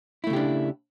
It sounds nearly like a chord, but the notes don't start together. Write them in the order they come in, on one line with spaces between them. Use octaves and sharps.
E4 A3 C#3 G4 D4